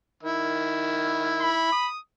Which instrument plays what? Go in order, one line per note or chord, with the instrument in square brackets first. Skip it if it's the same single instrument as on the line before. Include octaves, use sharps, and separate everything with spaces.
[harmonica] D#3 E4
[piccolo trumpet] B5
[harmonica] D#6